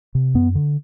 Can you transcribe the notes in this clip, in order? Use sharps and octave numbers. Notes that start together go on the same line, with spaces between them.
C3
F#2 B3
D3